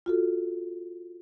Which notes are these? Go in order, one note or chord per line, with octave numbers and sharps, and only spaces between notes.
F4 F#4 A4